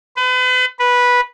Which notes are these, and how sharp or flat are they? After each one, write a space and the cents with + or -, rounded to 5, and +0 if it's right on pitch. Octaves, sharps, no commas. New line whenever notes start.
B4 +40
B4 -10